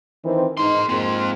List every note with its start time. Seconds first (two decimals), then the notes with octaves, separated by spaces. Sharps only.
0.25 D#3 E3 C4
0.57 G#2 D#4 A#4 C6
0.89 G#2 A#3 C4 F4